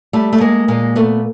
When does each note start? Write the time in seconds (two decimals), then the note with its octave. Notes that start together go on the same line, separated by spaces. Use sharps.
0.13 G3 A3
0.33 A3
0.40 G#3 A#3
0.68 A#2 G#3 A#3
0.96 A3 B3